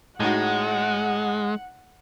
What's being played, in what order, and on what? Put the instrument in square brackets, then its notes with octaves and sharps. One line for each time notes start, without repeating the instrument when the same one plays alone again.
[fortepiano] A2 D#4 F#4 [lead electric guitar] G#3 [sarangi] F#5